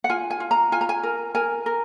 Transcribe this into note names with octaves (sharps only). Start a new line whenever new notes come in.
F#5
F4 G#5
G#5
F4
A#5
F4 G#5
A#5
G#5
A#4
A#4 G#5
A#4